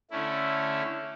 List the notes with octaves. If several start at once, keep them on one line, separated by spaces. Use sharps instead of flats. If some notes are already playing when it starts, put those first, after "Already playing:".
D3 A3 C#4 E4